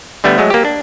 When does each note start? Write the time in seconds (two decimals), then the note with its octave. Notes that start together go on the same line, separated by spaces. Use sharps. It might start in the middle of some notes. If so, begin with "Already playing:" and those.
0.24 D3 G3 A3 B3
0.38 F#3 G#3 A3
0.50 A#3 G4
0.65 D4